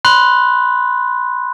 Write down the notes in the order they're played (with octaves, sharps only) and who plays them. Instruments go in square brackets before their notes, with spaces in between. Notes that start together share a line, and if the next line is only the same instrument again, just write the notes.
[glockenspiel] B5 C6 F#6